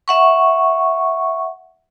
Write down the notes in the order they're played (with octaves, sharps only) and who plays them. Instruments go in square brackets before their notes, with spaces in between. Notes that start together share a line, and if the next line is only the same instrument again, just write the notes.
[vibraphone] E5 F#5 C#6